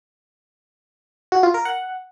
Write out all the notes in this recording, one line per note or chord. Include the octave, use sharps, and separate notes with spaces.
F#4
F4
A#4
F#5